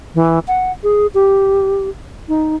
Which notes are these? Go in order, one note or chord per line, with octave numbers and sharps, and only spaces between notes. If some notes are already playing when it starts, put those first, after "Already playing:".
E3
F#5
G#4
G4
D#4